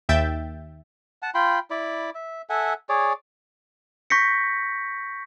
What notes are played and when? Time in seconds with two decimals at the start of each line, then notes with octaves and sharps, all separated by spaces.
0.09 D#2 E5 G5 G6 A6
1.22 F#5 A5
1.34 F4 G5 B5 C6
1.70 E4 D5 B5
2.15 E5
2.50 A4 E5 F#5 G#5
2.89 G#4 C#5 D5
4.10 C#6 G6 A#6 B6 C#7